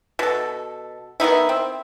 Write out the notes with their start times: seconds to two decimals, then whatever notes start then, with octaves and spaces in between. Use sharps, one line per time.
0.19 B2 A4
1.20 D#3 B3 D#4 E4
1.49 C4